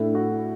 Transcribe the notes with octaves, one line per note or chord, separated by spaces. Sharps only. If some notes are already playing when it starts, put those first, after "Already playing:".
Already playing: A2 A3 D4 E4
F#4